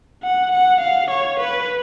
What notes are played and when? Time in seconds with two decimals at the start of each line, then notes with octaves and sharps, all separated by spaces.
0.22 F#5
0.51 F#5
0.81 F5
1.10 C#5
1.39 B4